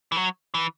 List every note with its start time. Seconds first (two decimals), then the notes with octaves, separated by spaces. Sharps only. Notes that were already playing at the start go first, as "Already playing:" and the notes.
0.12 E3
0.16 F#3
0.54 E3